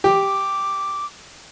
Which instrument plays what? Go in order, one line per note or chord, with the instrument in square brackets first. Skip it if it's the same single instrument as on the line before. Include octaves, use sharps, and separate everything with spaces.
[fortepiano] G4 [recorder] D6